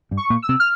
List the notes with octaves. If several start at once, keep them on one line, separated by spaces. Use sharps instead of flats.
G2 G3
C#6
A#2 A#3
E6
C3 C4
F6